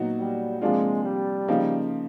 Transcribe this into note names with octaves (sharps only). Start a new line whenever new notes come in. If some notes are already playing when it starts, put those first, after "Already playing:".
Already playing: A#2 F#3 B3 D#4 F#4
G3
C3 F3 G#3 A#3 D4 F4
G3
C#3 F3 A#3 D#4